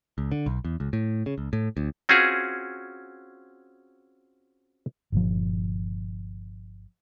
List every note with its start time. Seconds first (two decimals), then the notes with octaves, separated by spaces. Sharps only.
0.18 C#2
0.32 D3
0.46 B1
0.65 E2
0.80 C#2
0.93 A2
1.26 C#3
1.38 C#2
1.53 A2
1.77 D2
2.09 C4 C#4 F4 F#4 G#4
5.12 G1 A#2 F3